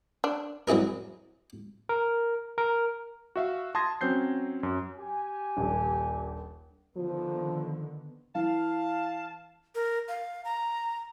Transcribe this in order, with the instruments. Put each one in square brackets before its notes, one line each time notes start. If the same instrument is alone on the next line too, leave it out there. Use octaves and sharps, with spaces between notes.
[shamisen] D4
[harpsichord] F#3 C4 E4 G#4 A#4
[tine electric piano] A#4
A#4
[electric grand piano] F#4 E5 F5
A5 C6 D#6 G#6 A#6
F#3 C4 C#4 G6 C7
F#2
[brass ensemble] G4 G#5
[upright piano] D#1 A#1
[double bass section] D3 D#3 B3 [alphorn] F3
[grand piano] E3 [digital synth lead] F5 [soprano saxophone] A5
[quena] A#4
F5
A#5